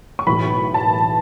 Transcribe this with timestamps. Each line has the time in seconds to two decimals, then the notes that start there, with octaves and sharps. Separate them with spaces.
0.19 C#6
0.27 B1 A2 E3 B5
0.74 A5